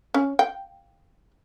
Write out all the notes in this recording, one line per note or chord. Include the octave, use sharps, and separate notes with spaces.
C#4
G5